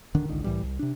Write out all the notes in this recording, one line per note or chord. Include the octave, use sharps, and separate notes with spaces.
D1 D3 D#3 D4
G#1 C#2 D3 D#3
C2 A2 E3 G3
C2
C3 D4